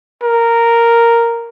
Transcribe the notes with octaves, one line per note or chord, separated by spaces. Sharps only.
A#4